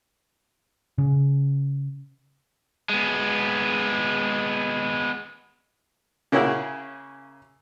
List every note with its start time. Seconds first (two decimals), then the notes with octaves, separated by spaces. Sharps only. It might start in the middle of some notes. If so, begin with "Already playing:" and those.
0.98 C#3
2.90 G#3 B3
6.32 C#3 A#3 C#4 E4 F#4 G#4